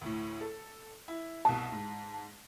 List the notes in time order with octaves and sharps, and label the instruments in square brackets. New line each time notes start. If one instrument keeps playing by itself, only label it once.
[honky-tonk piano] D2 A2
A4
E4
[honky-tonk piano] C2 B2 [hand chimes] A5
[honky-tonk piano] G#2